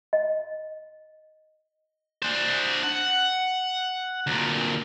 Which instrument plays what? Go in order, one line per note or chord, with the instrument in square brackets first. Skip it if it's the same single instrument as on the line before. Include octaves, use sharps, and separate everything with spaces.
[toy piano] D#5
[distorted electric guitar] D4 C5
F#5
D2 A#2